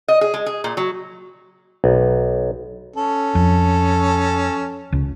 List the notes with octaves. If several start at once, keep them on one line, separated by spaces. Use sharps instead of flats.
D#5
G#4
G#3
G#4
A#2
F#3
B1
C#4 A4
F2
C#2 C#3